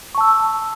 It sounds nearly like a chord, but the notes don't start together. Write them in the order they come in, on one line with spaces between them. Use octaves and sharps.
C#6 A5 E6